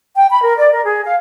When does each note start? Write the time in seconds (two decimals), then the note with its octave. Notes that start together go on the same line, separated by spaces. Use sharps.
0.16 G5
0.30 B5
0.42 A#4
0.56 D5
0.72 A#4
0.85 G#4
1.04 F5